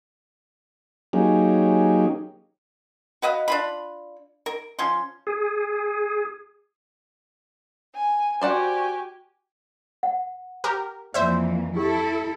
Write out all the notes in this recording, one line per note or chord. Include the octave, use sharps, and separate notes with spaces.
F#3 A#3 C#4 D#4 G4 G#4
F#4 B4 D#5 F5
D4 F4 B5
A#4
F3 C#4 C6
G#4
G#5
F#4 G4 C5 D5 F#5 G#5
F#5
G4 A#4
F2 E3 A#3 C5 D5 E5
E4 G4 A4